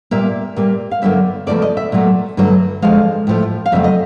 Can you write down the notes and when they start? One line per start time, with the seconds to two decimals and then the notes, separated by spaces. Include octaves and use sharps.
0.11 A#2 G3 A#3 E5
0.56 A#2 G3 A#3
0.91 F5
1.02 G2 D3 F#3 A#3 E5
1.47 E2 C#3 F3 A3 D5
1.62 D#5
1.77 E5
1.92 A#2 F#3 A3
2.37 G2 D3 F#3 A3
2.82 F2 D3 F3 G#3 F5
3.27 A2 F3 A3
3.66 F5
3.72 F2 C#3 F#3 A3 E5
3.84 D#5